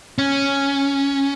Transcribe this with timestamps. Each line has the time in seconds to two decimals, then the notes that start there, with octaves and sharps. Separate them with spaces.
0.18 C#4